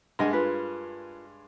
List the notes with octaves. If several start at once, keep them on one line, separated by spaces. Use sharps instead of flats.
G2 G#3 A#4 D#5 F#5 G#5
F4 A#4 B4